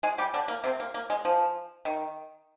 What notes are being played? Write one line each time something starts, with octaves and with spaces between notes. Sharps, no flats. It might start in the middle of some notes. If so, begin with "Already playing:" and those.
G#3 G#4
G3 G4
D3 D4
A#3
C3 C4
A#3
A#3
G#3
F3
D#3